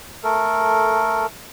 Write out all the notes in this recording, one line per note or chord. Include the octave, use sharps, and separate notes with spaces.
A3 A4 A#4